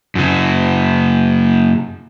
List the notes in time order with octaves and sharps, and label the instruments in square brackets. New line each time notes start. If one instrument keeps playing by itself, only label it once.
[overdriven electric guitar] F#2 C#3